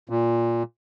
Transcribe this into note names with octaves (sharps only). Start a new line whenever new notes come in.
A#2